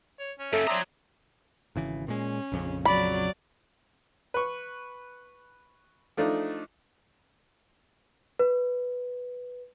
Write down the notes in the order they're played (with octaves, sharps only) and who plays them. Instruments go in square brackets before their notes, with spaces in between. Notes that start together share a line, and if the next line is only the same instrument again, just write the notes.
[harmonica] C#5
C#4
[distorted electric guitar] F#2 C#3 [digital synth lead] A4 [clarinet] E5
[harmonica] C4 D4 C5 [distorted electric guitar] C#5 A#5 [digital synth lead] D#6
[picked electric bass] G#1 C#3 E3
[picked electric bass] A#2 G#3 [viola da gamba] C#4
[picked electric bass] A#1 F2 C#3
[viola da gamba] F#3 D5 [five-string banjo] B5
[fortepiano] B4 C#6
F3 A3 D4 D#4
[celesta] B4